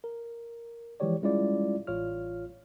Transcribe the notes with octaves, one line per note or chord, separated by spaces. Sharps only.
A#4
E3 F3 G#3 G4 C#5 D5
G3 G#3 C#4 E4 F4 D5
A1 F4 C#5 F6